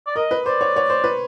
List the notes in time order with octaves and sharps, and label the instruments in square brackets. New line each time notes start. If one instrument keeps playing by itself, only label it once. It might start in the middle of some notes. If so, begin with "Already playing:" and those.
[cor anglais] D5
[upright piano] A#4 [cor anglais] D#5
[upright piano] B4
[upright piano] C5 [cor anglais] D5
[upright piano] C#5
C#5
C5
B4